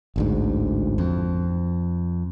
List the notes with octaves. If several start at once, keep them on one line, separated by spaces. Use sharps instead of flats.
A1 D2 G#2
F2